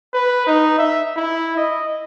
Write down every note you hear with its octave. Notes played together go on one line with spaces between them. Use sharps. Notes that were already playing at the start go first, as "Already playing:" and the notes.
B4
D#4
E5
E4
D#5